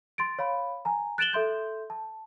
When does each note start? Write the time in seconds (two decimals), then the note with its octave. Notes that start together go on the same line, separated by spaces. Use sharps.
0.18 C6 A6 D7
0.39 C#5 F5 B5
0.85 G#5 A#5
1.18 F#6 A6 D7 E7 F#7 G7
1.33 A4 E5 C6 G6
1.90 A5